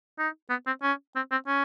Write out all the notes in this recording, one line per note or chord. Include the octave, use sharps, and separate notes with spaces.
D#4
B3
C4
C#4
C4
C4
C#4